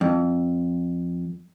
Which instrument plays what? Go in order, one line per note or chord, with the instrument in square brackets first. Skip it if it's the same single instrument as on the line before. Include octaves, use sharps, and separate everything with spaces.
[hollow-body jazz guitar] F2